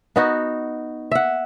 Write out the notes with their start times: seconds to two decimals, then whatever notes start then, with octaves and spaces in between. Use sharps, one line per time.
0.16 B3 D#4 F#4
1.11 E5 F#5